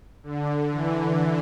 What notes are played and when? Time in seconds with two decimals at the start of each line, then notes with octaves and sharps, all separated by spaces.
0.23 D3
0.71 E3